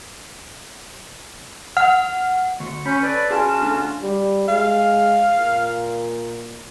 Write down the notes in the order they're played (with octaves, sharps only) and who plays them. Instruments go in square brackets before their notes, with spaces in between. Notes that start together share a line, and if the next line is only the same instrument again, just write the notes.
[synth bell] F#5 [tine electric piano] F6
[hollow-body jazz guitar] D2 [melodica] C#6
[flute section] C#4 G6 [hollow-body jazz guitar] B5
[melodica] A4 [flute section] B4 D5
[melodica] C#4 F4 F#4 [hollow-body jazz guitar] G#4 [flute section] A5
[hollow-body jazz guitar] D2 D3
[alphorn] G3
[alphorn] G#3 [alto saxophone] F5
[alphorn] A#2